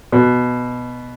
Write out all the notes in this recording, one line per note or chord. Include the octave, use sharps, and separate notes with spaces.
B2